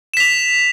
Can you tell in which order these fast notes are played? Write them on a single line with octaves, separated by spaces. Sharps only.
E7 B6 F7